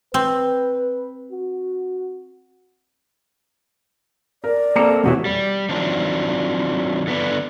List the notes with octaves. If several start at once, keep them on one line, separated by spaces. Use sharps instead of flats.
C4 B4
F#4
A#4 D5
A#3 C4 A4 A#5 D6 C#7
E2 B2 E3 G#3 F#4 G4 C#5
G3
D#3 F3 F#3 C4 D4
D3 B3 D4